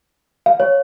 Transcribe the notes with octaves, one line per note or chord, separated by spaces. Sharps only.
F5
C#5